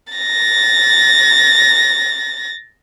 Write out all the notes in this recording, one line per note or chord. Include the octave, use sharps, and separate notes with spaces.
A6 A#6